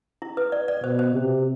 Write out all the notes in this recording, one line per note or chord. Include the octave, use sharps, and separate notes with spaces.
E4
B4
D5
D5
B2 C5
C5
C3